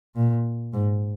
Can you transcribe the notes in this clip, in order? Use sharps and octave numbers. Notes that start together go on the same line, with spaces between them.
A#2
G#2